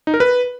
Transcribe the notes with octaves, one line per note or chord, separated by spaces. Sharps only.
D#4
A#4
B4